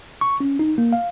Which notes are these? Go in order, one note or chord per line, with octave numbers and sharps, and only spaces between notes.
C#6
C#4
D#4
A#3
F5